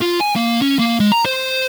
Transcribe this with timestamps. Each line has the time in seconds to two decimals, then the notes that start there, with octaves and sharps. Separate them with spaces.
0.01 F4
0.20 G#5
0.36 A#3
0.61 C#4
0.79 A#3
1.00 G#3
1.12 A#5
1.25 C5